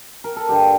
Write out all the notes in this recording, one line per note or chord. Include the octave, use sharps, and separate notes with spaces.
A#4
A4
G2 D3 G3 G4